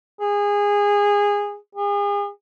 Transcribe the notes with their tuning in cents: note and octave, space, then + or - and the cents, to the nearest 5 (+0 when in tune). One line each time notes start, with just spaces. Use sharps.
G#4 -20
G#4 -40